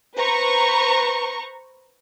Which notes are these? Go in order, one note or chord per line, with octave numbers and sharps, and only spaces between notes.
B4 C5 A#5 C#6